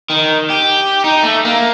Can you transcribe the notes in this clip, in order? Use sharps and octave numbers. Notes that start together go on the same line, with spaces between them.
D#3
G4
D#4
A3
A#3